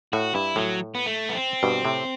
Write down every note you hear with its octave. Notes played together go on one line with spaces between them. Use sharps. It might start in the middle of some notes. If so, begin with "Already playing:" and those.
A2 F#4
G2 E4
A2 F#3
B3
A3
B3
C4
G2 B2
A2 C3